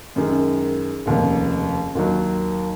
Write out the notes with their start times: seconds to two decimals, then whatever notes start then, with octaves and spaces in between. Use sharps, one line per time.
0.16 F#2 D#3 G#3
1.06 F1 D#2 C#3
1.95 D#2 D#3 F#3